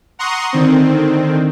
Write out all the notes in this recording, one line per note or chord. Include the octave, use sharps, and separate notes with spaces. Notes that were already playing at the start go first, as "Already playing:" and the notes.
F#5 A#5 C6 C#6 D#6
D3 D#3 C4